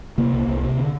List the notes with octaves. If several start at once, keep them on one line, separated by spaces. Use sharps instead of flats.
C3 A#3
C2
C2
C3
D3